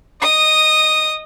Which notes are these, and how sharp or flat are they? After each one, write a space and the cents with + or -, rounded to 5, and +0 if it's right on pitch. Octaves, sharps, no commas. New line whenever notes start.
D#5 +0 D#6 -10